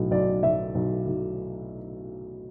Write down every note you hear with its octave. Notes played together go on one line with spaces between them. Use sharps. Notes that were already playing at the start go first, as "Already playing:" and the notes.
Already playing: B1 A2
B1 D5
B1 E5
B1
B1